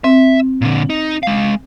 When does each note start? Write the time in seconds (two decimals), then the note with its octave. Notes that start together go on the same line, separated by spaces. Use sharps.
0.04 C4 E5
0.61 A#2 D3
0.90 D#4
1.23 G#3 F5